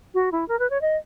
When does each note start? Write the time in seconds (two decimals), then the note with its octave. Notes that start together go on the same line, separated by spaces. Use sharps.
0.14 F#4
0.32 E4
0.48 A#4
0.59 B4
0.70 C#5
0.81 D#5